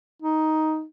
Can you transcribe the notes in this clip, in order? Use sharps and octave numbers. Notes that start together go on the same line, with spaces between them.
D#4